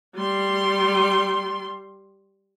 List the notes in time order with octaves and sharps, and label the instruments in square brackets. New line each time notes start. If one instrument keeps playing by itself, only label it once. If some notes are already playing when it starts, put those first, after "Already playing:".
[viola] G3 C6